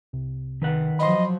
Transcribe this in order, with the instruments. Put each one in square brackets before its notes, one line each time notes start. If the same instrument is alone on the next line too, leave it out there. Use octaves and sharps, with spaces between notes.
[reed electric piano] C2 C3
[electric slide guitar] D#3 B4 F#5
[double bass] F3 F#3 [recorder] D#5 [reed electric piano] B5 C6